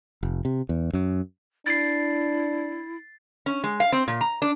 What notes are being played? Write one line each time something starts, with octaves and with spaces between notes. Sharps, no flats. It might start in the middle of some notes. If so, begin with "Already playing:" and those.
F1
C3
E2
F#2
D4 E4 A6 C7
C#4
G#3
F5
C4
A#2
A#5
D4